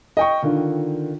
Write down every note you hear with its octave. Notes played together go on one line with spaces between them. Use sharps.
D#5 G5 C#6
D3 D#3 F4